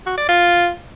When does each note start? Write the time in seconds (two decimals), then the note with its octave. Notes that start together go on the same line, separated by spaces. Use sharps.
0.06 F#4
0.17 D5
0.29 F4